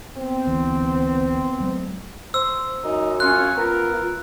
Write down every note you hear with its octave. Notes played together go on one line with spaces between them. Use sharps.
B3 C4
D2 E3
F#3 G#3 A3
C5 E6
F#2 D#4
C#4 F4 C#5 F#6
B3 F4 A#4